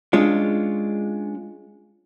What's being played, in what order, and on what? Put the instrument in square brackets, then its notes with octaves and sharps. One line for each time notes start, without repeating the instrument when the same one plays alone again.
[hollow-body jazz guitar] G#3 C#4 D4 F4